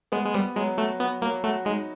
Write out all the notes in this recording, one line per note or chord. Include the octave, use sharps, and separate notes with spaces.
G#3 B3
G#3
G3 B3
F#3 G#3
A3 F#4
B3 F#4
F#3 A#3
A3 F#4
G#3 D#4